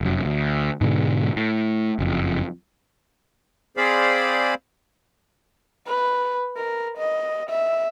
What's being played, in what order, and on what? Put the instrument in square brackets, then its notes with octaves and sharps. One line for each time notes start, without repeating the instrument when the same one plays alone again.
[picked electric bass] F1 F#2
D2
G#2 B2 D3 G#3
A2
F#1 F2
[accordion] C4 G#4 C5 D5 F5 B5
[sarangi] B4
A#4
D#5
E5